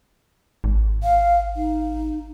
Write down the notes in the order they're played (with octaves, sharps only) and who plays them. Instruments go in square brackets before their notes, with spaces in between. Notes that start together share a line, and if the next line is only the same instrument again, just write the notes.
[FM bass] G#1
[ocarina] F5
D#4